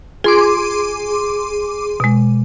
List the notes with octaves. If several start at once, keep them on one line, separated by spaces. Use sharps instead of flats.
F4 G#4 C6 D6
B2 G#3